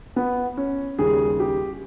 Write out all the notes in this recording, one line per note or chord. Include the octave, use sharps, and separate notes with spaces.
B3
C#4
D#2 C#3 G3 G#4
G4